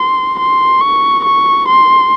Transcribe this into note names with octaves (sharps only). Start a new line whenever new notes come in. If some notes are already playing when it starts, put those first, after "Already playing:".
Already playing: C6
C6
C#6
C#6
C6